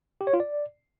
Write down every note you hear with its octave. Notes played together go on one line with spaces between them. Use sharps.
G4
C#5
F4
D5